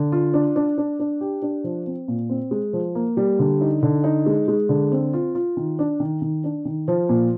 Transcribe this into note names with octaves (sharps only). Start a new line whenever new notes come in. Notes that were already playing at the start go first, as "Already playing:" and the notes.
Already playing: D3
F4
D4
D4
D4
D4
G4
D4
F3
C4
A#2
C4
G#3
F3
A#3
G3
D3
D#4
D3
D#4
G#3
G#3
D3
C4
F4
F4
D#3
D4
D#3
D#3
D4
D#3
F3
A#2